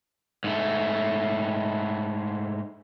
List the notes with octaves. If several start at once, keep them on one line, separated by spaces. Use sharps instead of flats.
G#2 A3